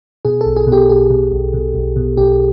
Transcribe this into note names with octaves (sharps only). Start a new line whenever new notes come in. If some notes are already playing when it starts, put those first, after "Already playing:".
B2 G#4
B1 A4
G#4
B2
G4
B1 G#4
B2
B1
B2
B1
B2
B1 G4